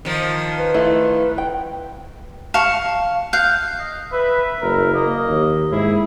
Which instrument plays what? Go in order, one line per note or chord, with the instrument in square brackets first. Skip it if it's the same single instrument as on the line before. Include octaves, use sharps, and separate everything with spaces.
[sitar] D#3 F3
[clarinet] B4
[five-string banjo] A3 E4 F4
G5
[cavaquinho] F5 C#6 [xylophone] A5
[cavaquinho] F5 [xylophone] F#6 G6 C7
[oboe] D#5
[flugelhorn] B4 [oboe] E5
[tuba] F#1 [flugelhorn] A#4
[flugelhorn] A#3 [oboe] D#5
[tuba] D#2
[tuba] G#2 [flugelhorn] E4 [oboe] G#4